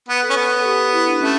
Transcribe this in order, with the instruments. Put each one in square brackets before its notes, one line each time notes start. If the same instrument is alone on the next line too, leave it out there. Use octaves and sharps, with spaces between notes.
[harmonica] B3 [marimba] B4
[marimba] A4
[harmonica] C#4
[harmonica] B3 [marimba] A4
[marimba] A4
G4
E4
D4
[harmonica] A3 [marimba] C#4